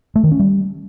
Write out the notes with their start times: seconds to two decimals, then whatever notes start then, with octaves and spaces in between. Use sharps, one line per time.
0.16 A3
0.24 D#3
0.31 C#4
0.39 G3